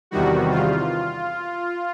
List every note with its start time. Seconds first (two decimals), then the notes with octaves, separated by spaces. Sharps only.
0.11 E2 C3 D#3 G3 F#4
0.51 F4